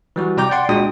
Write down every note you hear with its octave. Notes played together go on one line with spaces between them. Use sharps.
E3 G3 F#4
C3 D5 G5 A#5 D6 G6
D5 F#5 G5 C6
A#2 G#3 D4 F#4 G5 D#6